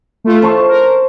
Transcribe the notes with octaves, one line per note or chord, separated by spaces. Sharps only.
A3 F4
C5 A5 C#6
A#4